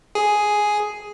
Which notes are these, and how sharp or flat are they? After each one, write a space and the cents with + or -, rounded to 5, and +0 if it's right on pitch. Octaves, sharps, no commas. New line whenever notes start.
G#4 +5